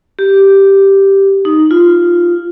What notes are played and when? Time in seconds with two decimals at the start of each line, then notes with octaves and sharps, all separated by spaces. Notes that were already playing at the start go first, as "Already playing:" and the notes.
0.19 G4
1.45 D#4
1.71 F4